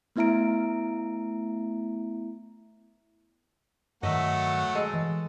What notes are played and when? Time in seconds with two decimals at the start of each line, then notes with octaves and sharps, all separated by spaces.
0.16 A3 B3 E4 E5 A#5 D7
4.03 G2 D#3 F#3 A3 D#5 E5 F#5
4.75 G#3 A4
4.94 E3